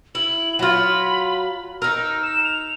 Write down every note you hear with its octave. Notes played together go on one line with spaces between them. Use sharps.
E4 F#7
F#3 F4 B5
D#4 A#4 E6
E7
F7